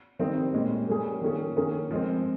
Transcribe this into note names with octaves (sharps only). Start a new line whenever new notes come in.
D#3 G3 C4 D#4
A#2 G#3 C#4 G4
G3 A#3 C#4 G#4
D#3 A#3 C#4 F4 G#4
D#3 A#3 C#4 G#4
F3 G#3 C4